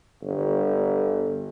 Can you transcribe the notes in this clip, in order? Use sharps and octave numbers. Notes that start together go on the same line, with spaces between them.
G1